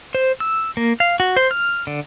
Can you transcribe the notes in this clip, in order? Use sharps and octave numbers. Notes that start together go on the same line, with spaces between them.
C5
E6
A#3
F5
F#4
C5
F6
D3